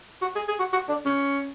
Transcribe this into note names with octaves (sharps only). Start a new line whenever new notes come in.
F#4
G#4
G#4
F#4
F#4
D4
C#4